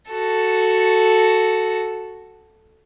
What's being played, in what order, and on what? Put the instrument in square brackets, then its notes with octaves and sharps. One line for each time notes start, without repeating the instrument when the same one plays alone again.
[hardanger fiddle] F#4 A4